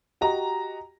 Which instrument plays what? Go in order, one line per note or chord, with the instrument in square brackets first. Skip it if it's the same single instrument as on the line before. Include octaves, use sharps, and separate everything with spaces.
[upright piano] F#4 G4 D#5 A#5